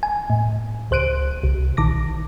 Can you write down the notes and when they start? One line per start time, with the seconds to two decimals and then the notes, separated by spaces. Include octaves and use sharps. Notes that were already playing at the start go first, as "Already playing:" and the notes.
0.03 G#5
0.30 A2
0.91 C#2 C5 F#6 D7 D#7
1.43 C2
1.77 A#1 D#3 D6 A#6